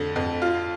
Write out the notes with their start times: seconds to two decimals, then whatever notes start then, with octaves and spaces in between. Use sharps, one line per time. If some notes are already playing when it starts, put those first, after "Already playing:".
Already playing: F2 D3
0.16 F2
0.42 F4